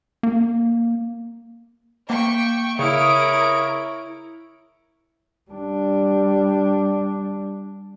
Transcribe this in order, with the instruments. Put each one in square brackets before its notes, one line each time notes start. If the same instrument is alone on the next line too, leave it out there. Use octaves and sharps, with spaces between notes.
[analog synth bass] A#3
[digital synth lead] A#3 [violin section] E5 G5 C#6
[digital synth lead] C#3 [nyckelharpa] E4 C#5 [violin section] A#4 D7 [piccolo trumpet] D#6
[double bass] G3 D4